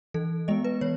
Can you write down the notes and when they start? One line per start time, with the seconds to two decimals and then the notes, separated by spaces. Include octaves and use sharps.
0.14 E3 A4
0.48 G#3 B3 D#5
0.64 B4
0.81 E3 C#5